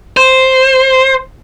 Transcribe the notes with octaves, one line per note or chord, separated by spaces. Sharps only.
C5